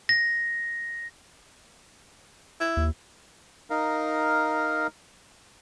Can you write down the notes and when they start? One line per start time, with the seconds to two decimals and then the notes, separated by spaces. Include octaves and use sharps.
0.09 A#6
2.60 E4
2.77 D#2
3.70 D#4 A#4 F5